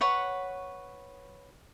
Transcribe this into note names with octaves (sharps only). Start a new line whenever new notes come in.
B4 C#5 F#5 C#6